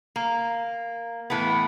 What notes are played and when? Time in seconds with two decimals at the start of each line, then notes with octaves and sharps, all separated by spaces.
0.16 A#3
1.30 A2 E3 A3 B3